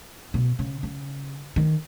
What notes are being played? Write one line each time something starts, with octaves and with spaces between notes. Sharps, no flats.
B2
C#3
C#3
D#3